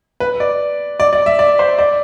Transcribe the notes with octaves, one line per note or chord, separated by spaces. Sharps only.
B4
D5
D5
D5
E5
D5
C5
D5